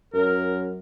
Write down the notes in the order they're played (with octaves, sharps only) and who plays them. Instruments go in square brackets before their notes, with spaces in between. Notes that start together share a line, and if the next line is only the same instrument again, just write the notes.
[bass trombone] F#2 [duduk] A#4